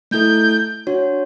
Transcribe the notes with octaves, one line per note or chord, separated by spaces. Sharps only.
A3 E4 A4 G6
D4 F#4 C#5